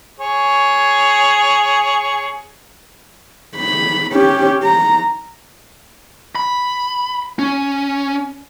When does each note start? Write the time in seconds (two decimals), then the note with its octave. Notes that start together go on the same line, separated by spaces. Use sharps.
0.20 G#4 C#5
3.57 B5
4.12 C#4 G4
4.63 A#5
6.35 B5
7.39 C#4